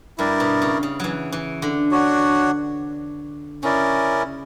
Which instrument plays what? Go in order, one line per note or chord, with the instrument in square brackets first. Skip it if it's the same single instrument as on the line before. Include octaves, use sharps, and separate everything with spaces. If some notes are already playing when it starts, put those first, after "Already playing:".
[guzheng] G2 [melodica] E4 A#4 D5
[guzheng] B2
C#3
C#3
E3 F#3
E3
D3
[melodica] D4 F#4 C#5 F#5
[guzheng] C#3 [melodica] C#4 E4 A#4 D5